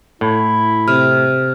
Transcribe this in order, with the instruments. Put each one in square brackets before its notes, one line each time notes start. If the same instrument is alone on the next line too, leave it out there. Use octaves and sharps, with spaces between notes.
[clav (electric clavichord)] A2 [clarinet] E4
[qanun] C3 [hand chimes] F6